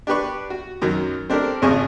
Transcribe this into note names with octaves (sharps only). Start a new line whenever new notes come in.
D4 G4 B4 C#6
F#4
F#2 D#3 F#3
C4 D4 G4 A4 A#4
G#1 F2 C#3 D#5 G#5 C#6